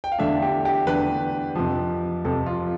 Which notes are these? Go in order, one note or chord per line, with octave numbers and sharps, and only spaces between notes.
G5
F5
E2 D3 A3 D4 E5
G4
G4
E2 D3 A3 D4 B4
F2 C3 F3
F2 C3 F3 A4
F4